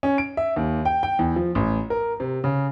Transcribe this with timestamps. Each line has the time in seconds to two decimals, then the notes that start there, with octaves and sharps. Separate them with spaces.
0.03 C#4
0.18 D7
0.37 E5
0.56 D#2
0.85 G5
1.03 G5
1.19 E2
1.36 F3
1.55 A1
1.90 A#4
2.20 C3
2.44 C#3